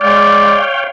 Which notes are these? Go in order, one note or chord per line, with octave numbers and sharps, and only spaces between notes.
G#3 C#5 D5 F5 G5